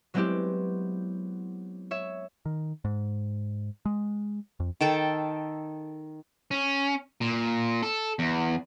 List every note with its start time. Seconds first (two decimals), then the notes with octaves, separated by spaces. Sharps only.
0.14 F#3 G#3 B3 C4 E4 G4
1.91 C#5 E5
2.46 D#3
2.85 G#2
3.85 G#3
4.60 F2
4.81 D#3 A4 G5 A5
6.51 C#4
7.21 A#2
7.83 A4
8.19 E2